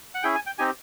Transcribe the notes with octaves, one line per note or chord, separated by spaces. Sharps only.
F#5
C#4 E4 G#4 G5
G#5
G5
C4 D#4 G4 G#5